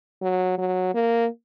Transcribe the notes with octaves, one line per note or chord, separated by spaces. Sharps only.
F#3
F#3
A#3